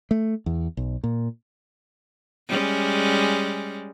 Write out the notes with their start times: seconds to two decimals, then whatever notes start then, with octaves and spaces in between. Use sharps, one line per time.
0.11 A3
0.46 E2
0.77 B1
1.04 A#2
2.48 G3 G#3 C#4